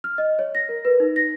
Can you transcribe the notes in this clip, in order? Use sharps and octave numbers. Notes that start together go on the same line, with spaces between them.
F6
D#5
C#5
A#6
A#4
B4
D#4
A#6